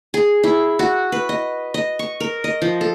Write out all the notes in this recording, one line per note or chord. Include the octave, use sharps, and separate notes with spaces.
G#4
E4
F#4
B4
D#5
D#5
C#6
A#4
D#5
F3
A4